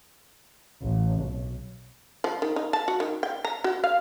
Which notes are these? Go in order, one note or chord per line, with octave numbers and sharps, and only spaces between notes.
A1
B1
F3
D#3
D#4
A5
F#4
D#3
G5
A#5
F#4
F5